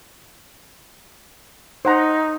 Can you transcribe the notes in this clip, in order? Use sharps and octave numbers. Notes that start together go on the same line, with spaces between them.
D#4 C5 F#5 A#5